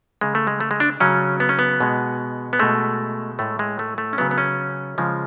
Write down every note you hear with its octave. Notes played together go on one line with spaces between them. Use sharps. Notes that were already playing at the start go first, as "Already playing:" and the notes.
C#3 G#3
A3
G#3
A3
G#3
D4
C#3 F#3 C#4
B3
C#4
B3
B2 G#3
B3
B2 G#3 A3
A2 G#3 A3
G#3
A3
A3
C#4
C#3 F#3 B3
B3
C#4
C#3 F3 G#3